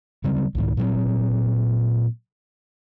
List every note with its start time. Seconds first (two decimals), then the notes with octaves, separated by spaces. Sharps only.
0.24 C#3 F#3 G3 C4
0.55 C2 G#2 D#3
0.77 A#2 F#3 C4